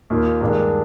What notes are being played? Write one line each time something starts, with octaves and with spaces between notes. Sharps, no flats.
D#2 D#3 A#3 F4
G2 D#3 G#3 D4